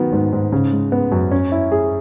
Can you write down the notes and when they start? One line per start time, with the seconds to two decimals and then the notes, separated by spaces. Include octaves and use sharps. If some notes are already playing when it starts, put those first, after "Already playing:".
Already playing: D#3 F#3 B3
0.12 G#2
0.32 G#2
0.52 C#3
0.72 G#3
0.92 B3
1.12 F#2
1.31 C#4
1.52 E4
1.72 G#4